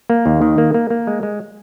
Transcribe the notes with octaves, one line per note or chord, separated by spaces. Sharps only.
A#3
D#2
D#3
A#3
A#3
A#3
G#3
G#3